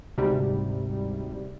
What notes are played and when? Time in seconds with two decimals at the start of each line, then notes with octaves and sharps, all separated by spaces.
0.18 D2 G#2 C3 G3